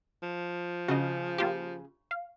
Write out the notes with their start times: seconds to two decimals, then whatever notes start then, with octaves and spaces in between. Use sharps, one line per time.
0.23 F3
0.88 C#3 F#4 D#5
1.38 A#3 F4 G4
2.11 F5